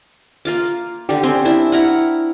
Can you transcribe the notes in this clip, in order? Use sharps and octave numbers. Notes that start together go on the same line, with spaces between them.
A#3 F4 D6
D3 G4
C4 C#4 C6
D4 E4 E5
E4 A#4 F#5